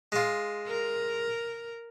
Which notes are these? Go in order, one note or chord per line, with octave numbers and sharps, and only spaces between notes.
G#3 F4
A#4